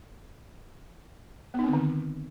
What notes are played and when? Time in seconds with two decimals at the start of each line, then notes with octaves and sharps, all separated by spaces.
1.54 B3
1.59 D#4
1.64 C4
1.69 D3
1.73 D#3